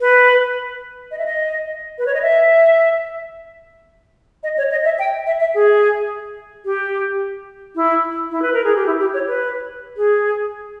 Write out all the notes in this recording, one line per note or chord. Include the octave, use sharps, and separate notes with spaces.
B4
D#5
E5
D#5
B4
C#5
D#5
E5
D#5
C#5
D#5
E5
G5
E5
E5
G#4
G4
E4
E4
B4
A#4
G#4
G4
E4
G4
C#5
B4
G#4